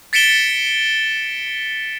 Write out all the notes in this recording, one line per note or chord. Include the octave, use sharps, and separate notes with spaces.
A6 B6 C#7 D7 E7 G7